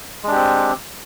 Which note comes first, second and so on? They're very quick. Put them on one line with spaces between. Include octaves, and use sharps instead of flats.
G#3 D4 G4 C4